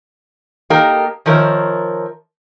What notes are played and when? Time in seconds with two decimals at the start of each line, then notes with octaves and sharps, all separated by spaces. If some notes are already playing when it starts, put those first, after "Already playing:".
0.70 A#3 D#4 G4 A4 A#4
1.26 D#3 F3 A#4 C#5 E5